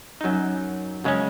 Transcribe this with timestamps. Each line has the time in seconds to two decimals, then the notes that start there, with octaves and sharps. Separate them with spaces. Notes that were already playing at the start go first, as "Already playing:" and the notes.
0.21 F#2 F#3 D#4
1.04 F#2 C#3 G#3 C#4